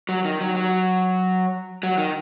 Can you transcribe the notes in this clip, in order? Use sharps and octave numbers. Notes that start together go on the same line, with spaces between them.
F#3
D#3
F#3
F#3
F#3
D#3